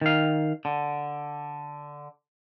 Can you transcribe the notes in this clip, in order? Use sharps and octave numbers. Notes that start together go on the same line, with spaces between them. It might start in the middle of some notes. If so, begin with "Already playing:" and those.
D#3 F5
D3